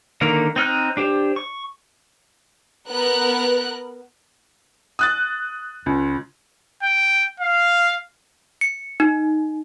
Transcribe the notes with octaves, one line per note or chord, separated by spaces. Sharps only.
D3 D#3 A#3 A#4
C4 D#4 F6 F#6
D4 G4 C5
C#6
B3 A#4 F#6
D#6 F#6 A6
C#2
G5
F5
C#7
D#4